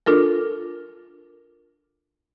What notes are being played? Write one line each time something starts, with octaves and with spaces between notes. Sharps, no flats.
D4 F4 A4 A#4